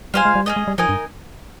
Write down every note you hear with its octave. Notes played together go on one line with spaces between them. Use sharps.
G3 F4 C5 F5 G#5
G#3
G3
G#3 C#4 G#4 D#5
G#3
G3
F3 D#4 A#4 D#5 G#5
G2